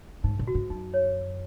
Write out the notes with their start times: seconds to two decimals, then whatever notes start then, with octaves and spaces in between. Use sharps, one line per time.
0.24 G#2 D#4
0.39 A#2
0.47 F#4
0.55 G#2
0.70 F#2 D#4
0.94 C#5